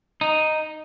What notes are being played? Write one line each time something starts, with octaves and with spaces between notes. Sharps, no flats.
D#4